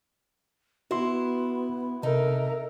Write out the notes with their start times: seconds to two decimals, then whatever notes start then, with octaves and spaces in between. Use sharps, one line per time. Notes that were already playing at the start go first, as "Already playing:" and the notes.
0.91 B3 E4 F#4 C6
2.03 C3 D#4 A4 A#4 E5